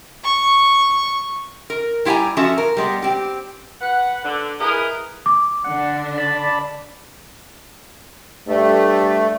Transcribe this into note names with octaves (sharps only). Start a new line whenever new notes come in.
C#6
A#4
G3 E4 G4 F5 G#5 A#5
F3 C#4 F#4 A4 E5
A#4
G3 G#3 B3
C4 G4
B4 F#5
D3
E4 G#4 A#4 B4 D#5
D6
D3 D4 F#5
D5 A5 B5
G2 A3